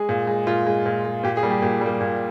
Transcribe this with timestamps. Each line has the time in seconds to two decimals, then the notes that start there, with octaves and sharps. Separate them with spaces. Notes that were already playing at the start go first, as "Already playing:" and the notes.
Already playing: G#3 G#4
0.09 A#2
0.27 G#3
0.47 A#2 F4
0.66 G#3
0.86 A#2
1.05 G#3
1.23 A#2 G4
1.37 G#4
1.43 G3 A#3
1.50 G4
1.62 A#2 G4
1.81 G3 A#3
2.01 A#2